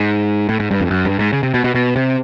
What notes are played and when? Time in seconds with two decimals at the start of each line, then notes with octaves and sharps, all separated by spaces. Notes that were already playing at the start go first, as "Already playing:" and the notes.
Already playing: G#2
0.49 A2
0.60 G#2
0.71 G2
0.81 F2
0.91 F#2
1.05 G2
1.19 G#2
1.33 C#3
1.43 C3
1.54 B2
1.64 B2
1.75 B2
1.96 C3